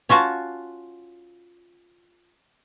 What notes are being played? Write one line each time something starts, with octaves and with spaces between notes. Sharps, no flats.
C#4 F4 F#4 A5